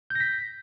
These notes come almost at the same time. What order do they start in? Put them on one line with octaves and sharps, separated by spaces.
G6 A#6 B6